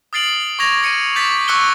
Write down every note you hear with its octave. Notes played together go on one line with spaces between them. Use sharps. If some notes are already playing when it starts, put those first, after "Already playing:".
D#6 F6 A6 C7 D7 F#7
D#6
C#6 D6 G#6 A#6 F7
C#7 D#7
D6 G6 A6 B6 F7
C#6 E6 F#6 C#7 G7